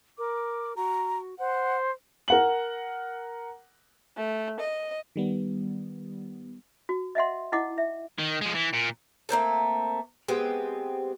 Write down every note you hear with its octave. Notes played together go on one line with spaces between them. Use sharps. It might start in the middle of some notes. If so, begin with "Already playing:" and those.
A#4 D6
F#4 A#5
C5 F#5
A#4 F#5 F#7
A3
D#5
D#3 G3 B3
F#4
D#5 E5 F#5 C6
D#4 E4 D#5 F#5 D6
E5
D#3
F3 G#3
E3
A#2
A3 A#3 C4 A4
G#3 B3 C4 G4